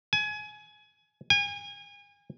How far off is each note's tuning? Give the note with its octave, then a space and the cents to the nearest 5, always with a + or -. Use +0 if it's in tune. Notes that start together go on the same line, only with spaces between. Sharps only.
G#5 +25
G#5 -35